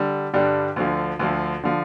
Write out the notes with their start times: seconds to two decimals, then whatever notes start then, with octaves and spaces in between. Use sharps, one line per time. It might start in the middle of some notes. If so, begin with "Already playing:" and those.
Already playing: D3 G3
0.33 G2 D3 G3 D4
0.76 D2 D3 F3
1.19 D2 D3 F3
1.63 D3 F3